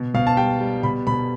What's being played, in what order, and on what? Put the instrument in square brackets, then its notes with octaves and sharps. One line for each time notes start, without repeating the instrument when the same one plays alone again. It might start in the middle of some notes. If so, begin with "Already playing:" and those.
Already playing: [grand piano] B2
B2 F5
A5
G3 G5
G3
B2 B5
B2 B5